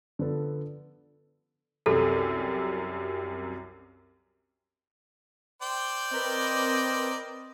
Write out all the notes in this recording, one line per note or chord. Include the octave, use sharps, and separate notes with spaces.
D3 F3 B3 A4
C2 F#2 C3 A4
C5 D5 G5
C4 A#4 B4 D#5